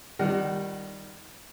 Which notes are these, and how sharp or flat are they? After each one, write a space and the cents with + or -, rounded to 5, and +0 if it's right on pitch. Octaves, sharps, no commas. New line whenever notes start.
D#3 +0 G3 +0 F#5 +25